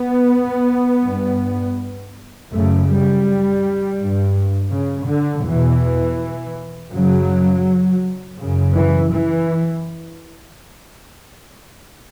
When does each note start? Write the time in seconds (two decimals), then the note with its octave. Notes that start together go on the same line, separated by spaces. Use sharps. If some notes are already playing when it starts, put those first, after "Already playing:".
Already playing: B3
1.05 G2
2.52 F#2 C#3 A3
2.88 G3
3.98 G2
4.72 C#3
5.08 D3
5.45 E2 B2 E3
6.91 F#2 C#3 F#3
8.38 F#2 C#3
8.74 E3
9.11 E3